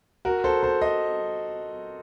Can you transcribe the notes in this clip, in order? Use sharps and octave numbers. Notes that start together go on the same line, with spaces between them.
F#4 A#4
A4 C5
A4 C5
C5 D#5